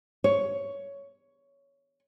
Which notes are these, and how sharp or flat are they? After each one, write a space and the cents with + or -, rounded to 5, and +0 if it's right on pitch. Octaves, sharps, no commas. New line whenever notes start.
C#5 +10